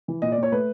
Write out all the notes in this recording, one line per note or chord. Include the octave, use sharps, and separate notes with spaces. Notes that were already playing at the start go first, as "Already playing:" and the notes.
E3
A#2 D#5
D5
A#2
C#5
A3 B4